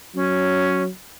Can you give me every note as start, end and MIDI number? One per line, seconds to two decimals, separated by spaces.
0.15 0.88 54
0.15 0.83 61